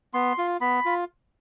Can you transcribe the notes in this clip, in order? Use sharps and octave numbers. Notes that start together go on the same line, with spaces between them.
B3 C6
F4
B3 B5
F4